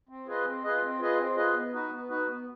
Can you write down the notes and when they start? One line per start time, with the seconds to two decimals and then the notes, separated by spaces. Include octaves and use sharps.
0.09 C4
0.26 F4 G#4 B4 D#5
0.45 C4
0.64 F4 G#4 B4 D#5
0.82 C4
0.99 F4 G#4 B4 D#5
1.18 C4
1.36 F4 G#4 B4 D#5
1.54 B3
1.72 D#4 F#4 B4
1.91 B3
2.08 D#4 F#4 B4
2.28 B3